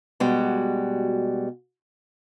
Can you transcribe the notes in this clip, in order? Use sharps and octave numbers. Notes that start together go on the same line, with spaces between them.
B2 G3 G#3 F#4